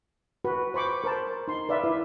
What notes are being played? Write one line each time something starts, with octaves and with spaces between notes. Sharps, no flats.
F#4 B4
C5 B5 C#6 D6
A#4 C5 A5
D#4 C6
B4 D5 E5 F5
E4